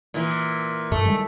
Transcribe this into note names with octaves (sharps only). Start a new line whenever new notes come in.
A#2 E3
G2 A3
D#3 G3 G#3